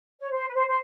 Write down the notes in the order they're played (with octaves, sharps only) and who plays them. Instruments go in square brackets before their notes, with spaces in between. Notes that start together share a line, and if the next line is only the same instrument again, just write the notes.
[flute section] C#5
C5
B4
C5
C5